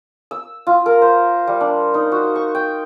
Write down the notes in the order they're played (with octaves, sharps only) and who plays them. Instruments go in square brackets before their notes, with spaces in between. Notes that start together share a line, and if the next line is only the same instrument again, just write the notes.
[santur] E6
F4
A#4
C5
G3
D4
D#4
F#4
C#6
G5